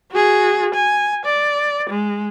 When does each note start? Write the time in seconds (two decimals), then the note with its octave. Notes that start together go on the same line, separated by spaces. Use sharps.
0.11 F#4 G#4
0.75 G#5
1.25 D5
1.90 G#3